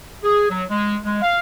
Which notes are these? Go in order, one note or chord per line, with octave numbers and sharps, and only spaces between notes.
G#4
F#3
G#3
G#3
F5